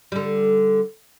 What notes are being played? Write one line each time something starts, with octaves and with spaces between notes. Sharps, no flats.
D3 G3